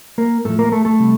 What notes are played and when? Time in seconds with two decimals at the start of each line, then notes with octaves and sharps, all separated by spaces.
0.18 A#3 A#4
0.45 A2 F3 A3 A4
0.59 A#3 A#4
0.72 A3 A4
0.85 A3 A4
0.99 C3 G3